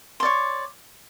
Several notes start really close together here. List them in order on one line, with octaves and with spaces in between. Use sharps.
C6 D5 C#5